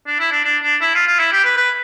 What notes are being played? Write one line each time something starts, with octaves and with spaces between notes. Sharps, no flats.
D4
E4
D4
D4
D4
E4
F4
F4
E4
G4
B4
B4